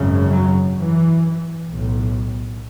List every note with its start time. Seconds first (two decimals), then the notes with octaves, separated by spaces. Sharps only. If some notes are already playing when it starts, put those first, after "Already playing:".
Already playing: G#1 F#2 C#3
0.32 F#3
0.77 E3
1.68 B1 A2